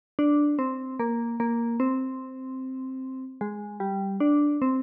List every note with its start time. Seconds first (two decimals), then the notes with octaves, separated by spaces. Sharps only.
0.19 D4
0.59 C4
0.99 A#3
1.40 A#3
1.80 C4
3.41 G#3
3.80 G3
4.20 D4
4.62 C4